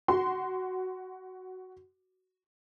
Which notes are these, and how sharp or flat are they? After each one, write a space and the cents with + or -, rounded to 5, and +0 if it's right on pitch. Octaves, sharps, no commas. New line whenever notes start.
F#4 +10 C6 -20